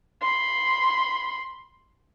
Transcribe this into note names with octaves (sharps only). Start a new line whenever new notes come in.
B5 C6